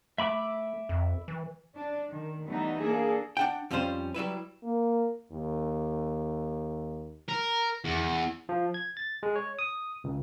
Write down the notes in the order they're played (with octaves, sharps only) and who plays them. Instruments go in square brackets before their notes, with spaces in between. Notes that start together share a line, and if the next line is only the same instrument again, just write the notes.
[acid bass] A3 [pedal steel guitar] E5 B5 D6
[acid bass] F2
E3
[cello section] D4
D#3
E3 G3 A3 B3 D#4
A#3 D4 G#4 A4
[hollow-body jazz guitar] D4 F#5 G5
F2 F3 G3 C#4 C5
F#3 G3 E4 B4
[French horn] A#3
D#2
[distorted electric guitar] A#4
E2
[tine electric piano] F3
G#6
A6
G#3
C#5
D#6
C#2